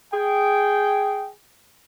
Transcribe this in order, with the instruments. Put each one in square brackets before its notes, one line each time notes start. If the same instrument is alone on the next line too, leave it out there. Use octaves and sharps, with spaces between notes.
[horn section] G#4 G5